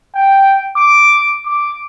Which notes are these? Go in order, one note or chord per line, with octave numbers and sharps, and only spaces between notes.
G5
D6
D6